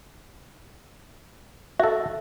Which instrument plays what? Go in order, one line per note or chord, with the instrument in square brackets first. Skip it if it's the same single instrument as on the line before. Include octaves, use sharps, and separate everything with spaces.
[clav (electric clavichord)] F#4 A4 [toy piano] E5